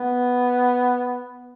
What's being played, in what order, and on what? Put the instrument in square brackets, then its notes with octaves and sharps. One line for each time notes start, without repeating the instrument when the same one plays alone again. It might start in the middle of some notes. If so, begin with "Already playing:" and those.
Already playing: [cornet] B3